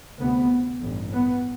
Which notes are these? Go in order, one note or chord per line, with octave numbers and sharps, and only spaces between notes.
D2 C3 B3
A1 G2
B3